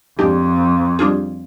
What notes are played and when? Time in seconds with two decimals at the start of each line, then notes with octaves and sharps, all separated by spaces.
0.19 F2 G#3 D4 G4
0.99 G3 D4 F4 G#4